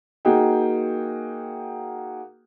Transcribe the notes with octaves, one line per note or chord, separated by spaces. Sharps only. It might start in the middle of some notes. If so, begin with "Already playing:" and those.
A#3 D#4 F#4 G#4 A#4 G5